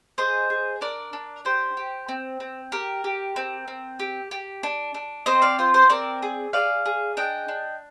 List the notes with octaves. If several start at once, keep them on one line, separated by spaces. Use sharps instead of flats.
G#4 C5 D#5
G#4
D4 A#4 D5
D4
G4 C5
G4
C4
C4
G4 A#4
G4
C4
C4
G4
G4
D4
D4
C4 C5 D#5
D5 F5
F4 C5
C5
C4 A#4 D5
G#4
G#4 D5 F5
G#4
D4 D#5 G5
D4